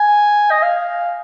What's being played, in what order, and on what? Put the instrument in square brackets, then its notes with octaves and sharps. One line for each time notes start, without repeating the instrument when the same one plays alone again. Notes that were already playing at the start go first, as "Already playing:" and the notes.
Already playing: [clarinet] G#5
D#5
F5